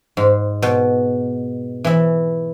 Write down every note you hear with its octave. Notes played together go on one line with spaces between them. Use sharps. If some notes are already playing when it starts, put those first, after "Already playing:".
G#2
B2
E3 E5